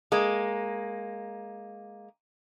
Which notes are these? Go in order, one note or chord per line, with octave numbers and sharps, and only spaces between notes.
G#3 A#3